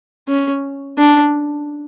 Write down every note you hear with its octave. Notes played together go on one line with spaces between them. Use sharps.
C#4
D4